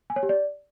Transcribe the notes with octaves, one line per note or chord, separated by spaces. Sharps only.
G#5
C#5
G4
D5